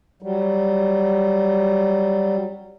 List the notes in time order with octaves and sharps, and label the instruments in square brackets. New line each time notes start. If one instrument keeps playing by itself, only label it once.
[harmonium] F#3 G3